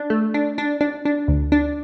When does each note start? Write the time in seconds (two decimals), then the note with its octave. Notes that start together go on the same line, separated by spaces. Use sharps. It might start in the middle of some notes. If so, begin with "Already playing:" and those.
Already playing: D4
0.10 A3
0.34 D4
0.58 D4
0.81 D4
1.05 D4
1.28 D2
1.52 D4